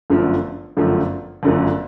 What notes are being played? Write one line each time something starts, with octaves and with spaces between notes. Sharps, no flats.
G1 F#2 D3 F3 A3
G1 F#2 D3 F3 A3
G1 F#2 D3 F3 A3